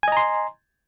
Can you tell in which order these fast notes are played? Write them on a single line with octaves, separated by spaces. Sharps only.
G#5 D#5 A#5 C6